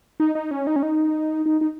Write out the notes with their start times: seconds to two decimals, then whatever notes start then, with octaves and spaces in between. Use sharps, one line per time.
0.20 D#4
0.35 D#4
0.51 C#4
0.67 D#4
0.76 C#4
0.83 D#4
1.46 D#4
1.61 D#4